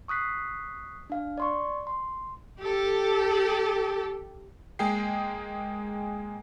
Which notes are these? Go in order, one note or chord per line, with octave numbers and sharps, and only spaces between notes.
C#6 D#6 F#6 B6 C7
D4 F5
D5 C6 C#6
C6
G4 A4
G#3 A#3 G#4 G5 C7